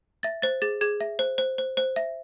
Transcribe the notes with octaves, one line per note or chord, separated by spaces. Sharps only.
E5 A6
C5 A6
G#4 A6
G#4 G#6
E5
C5
C5
C5
C5
E5